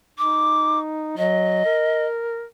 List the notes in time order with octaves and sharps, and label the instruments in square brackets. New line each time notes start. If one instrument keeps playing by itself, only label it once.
[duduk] D#4 [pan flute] D6
[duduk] F#3 [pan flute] D#5
[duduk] A#4